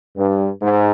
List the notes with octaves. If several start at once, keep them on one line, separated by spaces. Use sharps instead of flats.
G2
G#2